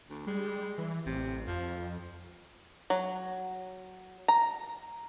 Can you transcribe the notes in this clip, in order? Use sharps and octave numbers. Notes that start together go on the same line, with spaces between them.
D2
G3 G#3
E3
A1 C3
F2 F3
F#3
A#5